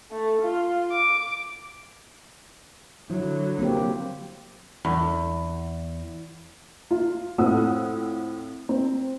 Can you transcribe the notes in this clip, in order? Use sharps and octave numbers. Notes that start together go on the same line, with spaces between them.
A3
F4
D6
D3 F#3 E4
A#3 C4 G4
E2
F4
A2 C4 F4 F#5 D#6 E6
C4